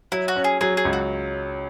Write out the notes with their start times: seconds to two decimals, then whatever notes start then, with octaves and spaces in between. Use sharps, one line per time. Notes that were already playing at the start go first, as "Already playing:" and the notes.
0.12 F#3 E4
0.28 F#4
0.36 C#4
0.44 G#4
0.61 F#3 G#4
0.77 G#4
0.85 C#2
0.93 F#4